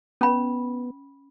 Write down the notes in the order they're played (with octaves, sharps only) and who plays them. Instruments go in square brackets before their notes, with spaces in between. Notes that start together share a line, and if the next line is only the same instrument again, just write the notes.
[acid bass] B3 [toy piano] C#4 B5